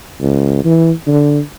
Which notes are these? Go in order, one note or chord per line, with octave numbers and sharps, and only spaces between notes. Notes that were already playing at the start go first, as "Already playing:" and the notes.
C#2
E3
D3